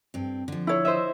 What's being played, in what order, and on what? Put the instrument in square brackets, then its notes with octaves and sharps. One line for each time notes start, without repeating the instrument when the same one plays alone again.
[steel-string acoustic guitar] G2 C4
D3 F3
[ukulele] E4 C#5
[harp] C5 D#5 E5